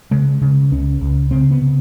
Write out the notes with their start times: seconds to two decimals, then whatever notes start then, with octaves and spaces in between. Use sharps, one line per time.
0.11 C#3 G#3
0.42 C#3
0.71 C#2 C#4
1.01 C#2
1.31 C#3 C4
1.51 B3
1.62 C#3